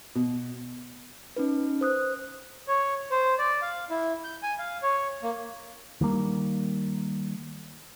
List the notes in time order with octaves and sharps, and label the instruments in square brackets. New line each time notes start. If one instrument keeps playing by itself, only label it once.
[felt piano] B2
[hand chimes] C#4 D#4 B4
C5 D#6 F#6
[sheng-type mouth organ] C#5
C5
D5
F5
E4
G6
G#5
F5
C#5
A#3
[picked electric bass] D#3 G3 A#3